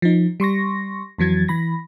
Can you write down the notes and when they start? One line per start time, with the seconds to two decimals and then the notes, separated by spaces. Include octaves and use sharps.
0.02 F3 D#4
0.40 G3 C6 C#6 A#6
1.18 F2 E3 F#3 G#6 A6
1.48 E3 B5 A#6